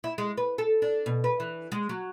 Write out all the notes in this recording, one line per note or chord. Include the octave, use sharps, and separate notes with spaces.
E4
G#3
B4
A4
D4
B2
B4
E3
G#3
F#3